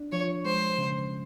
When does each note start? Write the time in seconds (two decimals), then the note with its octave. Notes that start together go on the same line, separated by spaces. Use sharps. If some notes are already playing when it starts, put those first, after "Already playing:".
Already playing: D4
0.12 F3 C#5
0.45 G#3 C5
0.78 C#3